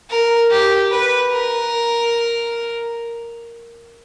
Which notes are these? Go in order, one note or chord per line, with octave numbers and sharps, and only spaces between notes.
A#4
G4
B4
A#4